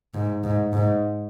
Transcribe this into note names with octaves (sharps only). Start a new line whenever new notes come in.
G#2
G#2
G#2